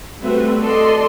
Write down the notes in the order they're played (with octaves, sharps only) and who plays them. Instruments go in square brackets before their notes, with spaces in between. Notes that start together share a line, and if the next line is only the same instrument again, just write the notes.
[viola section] G3 A3 C4 F#4 B4 E5
A4 D5 D#5 C6